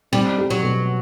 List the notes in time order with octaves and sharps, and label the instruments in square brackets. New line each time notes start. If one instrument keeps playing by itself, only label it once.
[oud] G3 [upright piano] C4
[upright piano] G4
[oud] F#3
[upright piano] B2